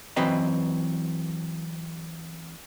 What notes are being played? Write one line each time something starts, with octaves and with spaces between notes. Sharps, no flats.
E3 F#3 C4 B4 D#5 A#5